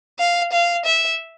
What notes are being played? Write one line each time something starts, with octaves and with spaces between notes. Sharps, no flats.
F5
F5
E5